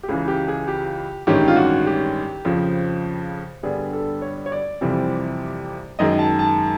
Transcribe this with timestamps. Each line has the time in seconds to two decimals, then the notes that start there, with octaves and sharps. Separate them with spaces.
0.03 G4
0.08 C#2 C#3 E3 G#4
0.28 G4
0.48 G#4
0.68 G4
1.27 A1 G2 D#3 G#3 C#4 G4
1.48 F4
1.56 F#4
1.86 G4
2.45 F2 C#3 F3
3.63 G2 D3 G3 B3 G#4
3.93 A4
4.22 C#5
4.46 C#5
4.52 D5
4.81 F2 C3 E3 G3 C4
5.99 F#2 D#3 G#3 D#5
6.19 A5
6.39 A5